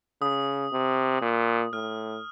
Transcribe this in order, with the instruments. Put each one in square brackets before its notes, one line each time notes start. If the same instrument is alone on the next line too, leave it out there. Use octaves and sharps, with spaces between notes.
[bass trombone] C#3 [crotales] D#6
[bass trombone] C3
A#2
[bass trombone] A2 [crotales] F6